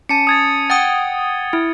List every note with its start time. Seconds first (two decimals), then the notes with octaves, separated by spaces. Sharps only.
0.09 C#4 A5 C#7 D#7
0.27 D#6 G#6 A6
0.70 F#5 G5 D#6 A6 G7
1.53 E4 G#6